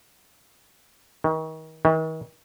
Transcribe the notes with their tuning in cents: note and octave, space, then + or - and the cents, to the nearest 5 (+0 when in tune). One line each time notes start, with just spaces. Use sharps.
D#3 +35
D#3 +45